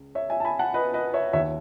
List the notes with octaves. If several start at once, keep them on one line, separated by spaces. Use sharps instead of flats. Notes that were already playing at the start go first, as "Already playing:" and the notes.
Already playing: C#2
C#5 E5
E5 G#5
A5
G#5 B5
F#5 A5
B4 D#5
B4 D#5
C#5 E5
D#2 D#3 C#5 E5